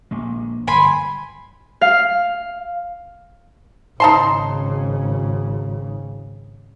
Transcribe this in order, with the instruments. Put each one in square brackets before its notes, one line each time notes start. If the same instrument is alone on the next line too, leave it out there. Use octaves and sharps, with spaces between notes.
[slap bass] A#1 A#2 G#3
[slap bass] G1 [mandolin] G#5 B5 C6
[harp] F5
[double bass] G#1 C#3 [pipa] D#4 A5 C6